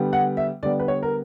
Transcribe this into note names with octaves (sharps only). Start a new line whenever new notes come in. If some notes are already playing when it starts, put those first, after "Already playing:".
Already playing: D3 G3 B3
F#5
E5
D3 G3 B3 D5
B4
C#5
A#4